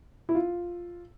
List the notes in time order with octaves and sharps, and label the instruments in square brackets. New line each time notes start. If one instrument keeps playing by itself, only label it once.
[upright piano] E4
F4